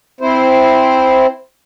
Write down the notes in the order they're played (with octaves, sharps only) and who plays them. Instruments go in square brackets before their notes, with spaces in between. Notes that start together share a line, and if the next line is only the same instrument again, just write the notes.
[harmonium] C4 E4 C5